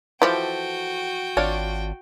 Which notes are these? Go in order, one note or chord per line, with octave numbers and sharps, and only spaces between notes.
E3 F3 F#4 G4 A4 G5
G#1 D4 F4 C#5